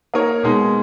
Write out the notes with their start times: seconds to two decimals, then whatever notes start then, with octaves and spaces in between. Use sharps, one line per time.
0.14 A#3 D#4 A#4 C#5
0.43 B2 G#3 D#4